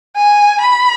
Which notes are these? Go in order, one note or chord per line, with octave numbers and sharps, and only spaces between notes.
G#5
B5